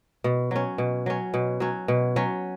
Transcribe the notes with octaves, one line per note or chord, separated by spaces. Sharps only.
B2
F#3 C#4
B2
F#3 C#4
B2
F#3 C#4
B2
F#3 C#4